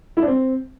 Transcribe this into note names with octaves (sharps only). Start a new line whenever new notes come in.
E4
D4
C4